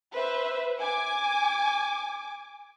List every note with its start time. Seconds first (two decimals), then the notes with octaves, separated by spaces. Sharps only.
0.15 B4 C5 E5
0.79 G#5 D6